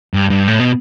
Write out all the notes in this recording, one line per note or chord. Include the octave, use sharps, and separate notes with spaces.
G2
G2
A2
B2